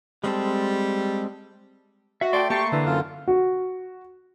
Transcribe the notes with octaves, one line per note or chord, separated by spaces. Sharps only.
G3 G#3 C4 A4
F#4 E5
A3 D5 G5 C6
A#3 G4 A5 C6 C#6
D3 E3
F#2 F4
F#4